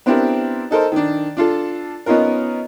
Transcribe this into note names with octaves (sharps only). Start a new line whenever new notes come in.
B3 C4 D4 E4 G4 A#4
D#4 A4 A#4 C5
D#3 D4
D4 F4 A4
B3 C#4 D#4 F4 A#4